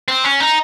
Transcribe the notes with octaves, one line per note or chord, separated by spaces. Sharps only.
C4
C#4
D#4